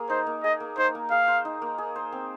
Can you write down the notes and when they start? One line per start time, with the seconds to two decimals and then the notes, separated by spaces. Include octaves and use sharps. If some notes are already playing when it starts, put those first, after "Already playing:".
Already playing: A#3 G#4
0.10 D#4 C5
0.27 A#3
0.43 G#4 D#5
0.60 A#3
0.77 D#4 C5
0.95 A#3
1.11 G#4 F5
1.28 C5
1.45 D#4
1.62 A#3
1.78 G#4
1.96 C5
2.12 C4